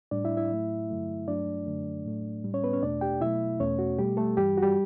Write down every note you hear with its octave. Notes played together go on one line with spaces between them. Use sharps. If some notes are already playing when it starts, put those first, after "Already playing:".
A2 G3 D4 D5
E4 E5
E4 E5
A2 F#3 A3
G2 D3 F#3 A3
G2 F#3 A3 D4 D5
F#2 D3 F#3 A3
A2 F#3 A3
A2 G3
C#4 C#5
B3 B4
C#4 C#5
E2 B2 A3 D4 D5
G4 G5
B2 F#3 A3 E4 E5
E2 B2 A3 C#4 C#5
F#4
B2 G3 A3 G4
A3 A4
G2 E3 G3 G4
F#4
G3 G4